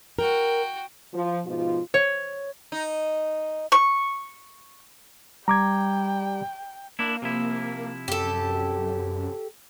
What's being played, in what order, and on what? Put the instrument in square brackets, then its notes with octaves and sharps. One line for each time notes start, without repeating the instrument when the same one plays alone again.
[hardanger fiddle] F#4 G5 [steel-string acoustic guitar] A#4
[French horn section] F3
G#2 B2 F3 F4
[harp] C#5
[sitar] D#4
[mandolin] C#6
[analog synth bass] G3 [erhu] G5 [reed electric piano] A#5 D6 G#6
[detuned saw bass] A#3 [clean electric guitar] D4 E4
[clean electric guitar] C3 F3 E4
[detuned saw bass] F#2 [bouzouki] G4 A4